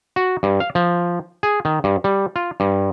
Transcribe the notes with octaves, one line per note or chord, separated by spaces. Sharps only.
F#4
G2
F5
F3
G#4
D#3
G2
G3
F4
G2